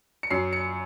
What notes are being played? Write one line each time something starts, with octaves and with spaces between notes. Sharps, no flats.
C#7
F#2 C7
C#7